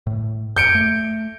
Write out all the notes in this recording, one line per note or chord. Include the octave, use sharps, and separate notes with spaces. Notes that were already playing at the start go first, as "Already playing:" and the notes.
A2
F#2 G6 C#7 D7
A3